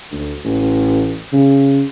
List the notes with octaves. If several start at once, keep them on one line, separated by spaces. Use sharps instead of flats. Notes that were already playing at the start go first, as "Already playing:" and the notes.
D2
A1
C#3